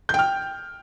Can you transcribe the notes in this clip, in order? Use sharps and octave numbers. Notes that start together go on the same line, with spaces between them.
G5 F6 G6